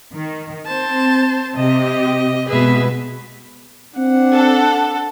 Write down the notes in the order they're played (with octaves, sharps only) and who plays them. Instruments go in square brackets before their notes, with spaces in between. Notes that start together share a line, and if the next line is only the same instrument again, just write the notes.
[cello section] D#3
[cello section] C4 [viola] C5 A5
[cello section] C3 G4 [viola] D#5
[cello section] B2 G#3 B4 [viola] G#4 E5
[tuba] C4 [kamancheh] D4 F#5
[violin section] A4